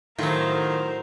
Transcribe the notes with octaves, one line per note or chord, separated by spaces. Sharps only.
A2 D#3 F#3 A3 F4 A#4 C5